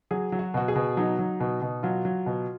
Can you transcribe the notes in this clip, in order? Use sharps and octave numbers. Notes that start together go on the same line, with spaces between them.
F#3 G#4
F#3
F#4
B2 F#4
G#4
B2
F#3 D#4
F#3
B2
B2
F#3 F4
F#3
B2